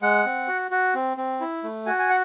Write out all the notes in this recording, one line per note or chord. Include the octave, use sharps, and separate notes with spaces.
G#3 F#5
C4
F#4
F#4
C4
C4
E4
A3
F#4 G#5
G#5
F#5